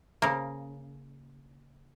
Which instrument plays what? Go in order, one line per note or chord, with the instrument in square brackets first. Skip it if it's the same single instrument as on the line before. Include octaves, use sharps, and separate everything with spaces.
[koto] C#3 A#3